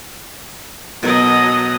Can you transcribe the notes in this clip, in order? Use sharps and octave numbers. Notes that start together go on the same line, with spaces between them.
B2 F#3 A#4 D#5